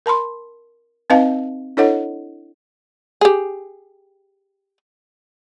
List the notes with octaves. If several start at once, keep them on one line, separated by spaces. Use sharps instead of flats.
A#4 A5 B5 C6
C4 D#4 B4 D#5 F5 A5
D4 E4 A4 C#5 D#5 F#5
G4 G#4